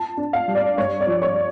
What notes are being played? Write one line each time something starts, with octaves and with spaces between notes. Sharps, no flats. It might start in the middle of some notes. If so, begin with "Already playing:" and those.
Already playing: F4 A5
D4
F5
G3
D5
G2 C#5
D5
F3
C#5